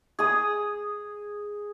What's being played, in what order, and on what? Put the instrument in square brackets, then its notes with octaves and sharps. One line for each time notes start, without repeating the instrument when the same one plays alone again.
[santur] G#4 D#6